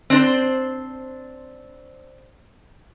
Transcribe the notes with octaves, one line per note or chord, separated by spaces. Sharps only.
C4 D4 C5